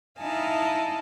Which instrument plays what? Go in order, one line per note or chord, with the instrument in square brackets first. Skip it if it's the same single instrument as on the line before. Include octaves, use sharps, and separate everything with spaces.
[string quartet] D#4 E4 D#5 F5 G#5 A5